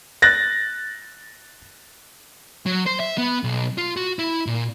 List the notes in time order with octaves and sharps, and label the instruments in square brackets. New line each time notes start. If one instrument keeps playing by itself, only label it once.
[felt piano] F#6 A6 A#6
[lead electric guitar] F#3
C5
E5
B3
B1
F4
F#4
E4
A#2